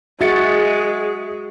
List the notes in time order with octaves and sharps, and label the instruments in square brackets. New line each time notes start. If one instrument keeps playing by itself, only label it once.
[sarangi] G#3 [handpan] F#4 [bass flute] G#4 [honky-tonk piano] E5 A6 C#7